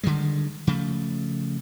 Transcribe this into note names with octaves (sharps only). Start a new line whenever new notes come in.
D3 D#3 G3 G#3
C#3 F3 A3